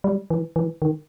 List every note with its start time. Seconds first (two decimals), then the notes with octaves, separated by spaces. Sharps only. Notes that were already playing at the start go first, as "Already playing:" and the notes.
0.04 G3
0.30 E3
0.56 E3
0.82 D#3